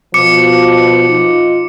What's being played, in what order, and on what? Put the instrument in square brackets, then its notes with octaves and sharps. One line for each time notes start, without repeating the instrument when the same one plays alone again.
[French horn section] B2 F3 [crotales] D6 C#7
[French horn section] D#4 F4